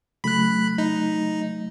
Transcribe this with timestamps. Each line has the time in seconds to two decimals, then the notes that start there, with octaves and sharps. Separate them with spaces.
0.24 C#3 F#3 A3 B5 F#6
0.78 D#4